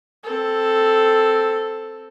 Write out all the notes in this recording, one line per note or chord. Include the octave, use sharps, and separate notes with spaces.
C4 A4